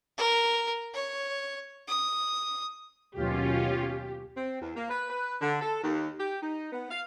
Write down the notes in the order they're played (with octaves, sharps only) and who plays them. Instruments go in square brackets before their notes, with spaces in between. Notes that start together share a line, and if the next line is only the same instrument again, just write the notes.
[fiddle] A#4
C#5
D#6
[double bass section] D#2 B2 F#3 [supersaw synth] C#4 F4 [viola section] G4
[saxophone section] C4
E2
A#3
B4
B4
D3
A4
D#2
G4
D#4
B3
F5